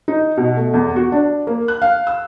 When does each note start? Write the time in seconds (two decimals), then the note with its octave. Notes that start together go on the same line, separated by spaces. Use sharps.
0.08 D#4
0.37 B2
0.56 A3
0.74 E2
0.96 F#4
1.12 D4
1.47 A#3
1.68 F#6
1.82 F5
2.07 E6